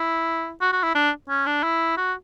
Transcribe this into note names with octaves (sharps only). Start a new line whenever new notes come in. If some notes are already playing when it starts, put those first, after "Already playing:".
Already playing: E4
F#4
F#4
E4
D4
C#4
D4
E4
F#4